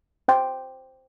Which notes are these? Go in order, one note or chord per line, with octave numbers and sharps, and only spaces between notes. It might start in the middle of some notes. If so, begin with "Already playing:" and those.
C5 G5 C6